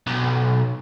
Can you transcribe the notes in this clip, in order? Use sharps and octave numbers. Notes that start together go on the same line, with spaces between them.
B1